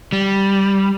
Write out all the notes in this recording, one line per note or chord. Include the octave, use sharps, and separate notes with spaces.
G3